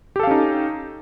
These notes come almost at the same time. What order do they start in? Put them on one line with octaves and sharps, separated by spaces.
G4 A4 F5 C#4 D#4